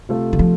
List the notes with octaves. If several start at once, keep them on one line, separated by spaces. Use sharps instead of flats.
C3 A3 F4 A4
D3
F3